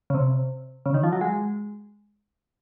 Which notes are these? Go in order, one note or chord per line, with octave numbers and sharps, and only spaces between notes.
C#3
C3
C#3
D#3
F3
F#3
G#3